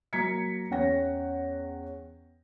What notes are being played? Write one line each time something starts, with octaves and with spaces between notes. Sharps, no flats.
F#3 A#3 A#5 G#6 B6 C#7
E2 C#4 C#5 F#5 G5 A#6